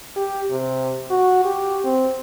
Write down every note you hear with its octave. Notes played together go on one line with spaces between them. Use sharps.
G4
C3
F#4
G4
C4